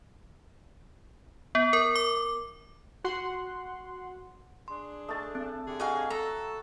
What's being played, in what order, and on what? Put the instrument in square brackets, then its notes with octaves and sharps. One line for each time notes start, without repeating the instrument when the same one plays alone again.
[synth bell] B3
A#4
D6
[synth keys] F#4 F#5 C6
[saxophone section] D4 G#4 [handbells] C6
[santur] A3 A5 [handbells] D#6
[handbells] C4
[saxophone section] D3 G4 G#4
[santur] F#4 [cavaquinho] D#5 F5 G#5
[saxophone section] A4 [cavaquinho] A#5